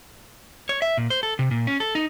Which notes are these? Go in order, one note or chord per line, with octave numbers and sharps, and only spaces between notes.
C#5
E5
A#2
C5
A4
C3
A#2
C#4
A4
D#4